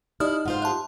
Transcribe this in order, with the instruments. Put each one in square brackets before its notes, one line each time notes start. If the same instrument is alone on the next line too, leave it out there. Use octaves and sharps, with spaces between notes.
[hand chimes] D#4 [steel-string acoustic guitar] E4 [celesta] G4 D#5 [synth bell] D5 D#6 F6
[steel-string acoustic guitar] G#2 F4 C5 [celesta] F#5
[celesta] G4 C6 F#6 [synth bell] E5 A5